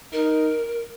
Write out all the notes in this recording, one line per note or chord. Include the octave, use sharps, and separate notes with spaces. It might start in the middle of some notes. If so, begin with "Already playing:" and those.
D#4 A#4